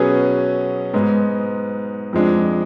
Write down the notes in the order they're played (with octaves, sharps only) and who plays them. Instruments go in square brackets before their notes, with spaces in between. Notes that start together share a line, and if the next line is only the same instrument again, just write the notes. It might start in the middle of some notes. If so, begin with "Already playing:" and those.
Already playing: [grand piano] B2 F#3 C#4 G#4 B4
G#2 G#3 B3
F2 F3 G#3 D4